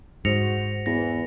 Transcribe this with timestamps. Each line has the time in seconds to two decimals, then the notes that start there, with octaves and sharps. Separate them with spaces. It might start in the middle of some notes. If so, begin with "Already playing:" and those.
0.25 G#2 F#4 C5 A#6 C#7 F7
0.86 E2 E3 A#6